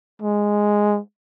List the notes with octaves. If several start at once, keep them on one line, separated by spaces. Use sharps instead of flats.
G#3